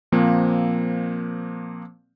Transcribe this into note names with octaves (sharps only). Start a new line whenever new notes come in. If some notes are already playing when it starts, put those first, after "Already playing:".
A#2 F3 A#3 C4